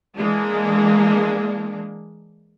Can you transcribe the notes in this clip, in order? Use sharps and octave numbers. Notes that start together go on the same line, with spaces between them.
E3 G#3 A#3 D4